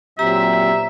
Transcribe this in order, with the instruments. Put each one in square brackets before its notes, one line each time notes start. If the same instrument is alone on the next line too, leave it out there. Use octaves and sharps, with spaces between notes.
[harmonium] A#2 F#3 C4 [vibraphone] G4 A#5 [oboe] E5